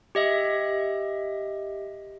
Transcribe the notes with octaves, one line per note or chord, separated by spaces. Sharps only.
G4 D#5 E5